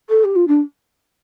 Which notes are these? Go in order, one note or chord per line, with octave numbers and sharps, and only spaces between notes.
A4
G4
F4
D4